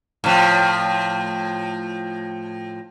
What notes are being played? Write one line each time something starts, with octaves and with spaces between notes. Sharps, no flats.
A2 F3